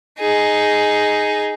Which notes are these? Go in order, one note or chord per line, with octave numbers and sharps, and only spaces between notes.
D#4 G#4